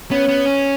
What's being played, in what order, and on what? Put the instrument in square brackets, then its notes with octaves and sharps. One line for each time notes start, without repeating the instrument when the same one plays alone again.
[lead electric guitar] B3 [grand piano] C#4
[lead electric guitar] B3
C#4